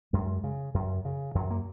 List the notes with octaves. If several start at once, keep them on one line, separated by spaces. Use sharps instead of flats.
F#2 G#3
C#3
F#2
C#3
F#2 F#3
A#3